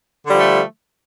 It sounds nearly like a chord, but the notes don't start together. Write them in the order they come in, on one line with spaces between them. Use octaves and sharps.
D3 G3 F3 A3